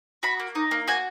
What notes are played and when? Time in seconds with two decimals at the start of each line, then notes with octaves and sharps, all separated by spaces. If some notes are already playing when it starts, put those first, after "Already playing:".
0.23 F#4 B5
0.40 A#3
0.55 D#4
0.71 A#3
0.88 F#4 G#5